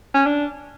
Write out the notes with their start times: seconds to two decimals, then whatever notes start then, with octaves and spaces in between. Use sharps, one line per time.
0.15 C#4
0.26 D4